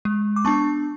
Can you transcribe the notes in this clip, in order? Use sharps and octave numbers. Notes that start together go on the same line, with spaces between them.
G#3
D6
B3 D4 A5 C#6